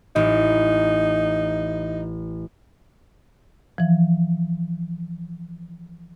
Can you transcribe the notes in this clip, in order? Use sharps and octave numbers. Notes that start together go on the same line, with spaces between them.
A1 D#4
E3 F3